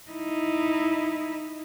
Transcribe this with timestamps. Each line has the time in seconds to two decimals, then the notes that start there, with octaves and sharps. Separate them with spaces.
0.11 D#4 E4